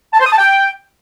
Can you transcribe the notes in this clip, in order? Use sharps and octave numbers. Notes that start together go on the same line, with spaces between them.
A5
C5
D#6
A5
G5